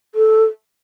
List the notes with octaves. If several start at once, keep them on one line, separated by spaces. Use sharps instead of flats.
A4